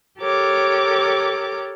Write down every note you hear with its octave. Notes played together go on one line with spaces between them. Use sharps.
G4 A4 A#4 C#5 D6